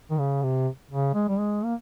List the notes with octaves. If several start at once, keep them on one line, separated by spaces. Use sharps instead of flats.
D#3
C#3
C3
C#3
G#3
G3
G#3
A#3